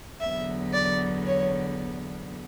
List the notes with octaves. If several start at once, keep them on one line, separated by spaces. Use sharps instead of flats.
E2 D3 F#3 B3 E5
D5
C#5